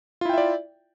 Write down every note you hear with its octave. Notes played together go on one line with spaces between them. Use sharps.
E4 F4 D5 E5 G5